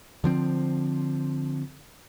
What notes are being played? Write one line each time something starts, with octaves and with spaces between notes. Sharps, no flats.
D3 F3 C4